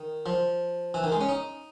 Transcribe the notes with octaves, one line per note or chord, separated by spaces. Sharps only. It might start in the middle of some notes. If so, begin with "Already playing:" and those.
Already playing: D#3
F3
E3
D#3
G#3
C#4
D#4